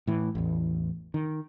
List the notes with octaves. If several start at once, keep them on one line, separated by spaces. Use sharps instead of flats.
A2 E3
A1 E2
D#3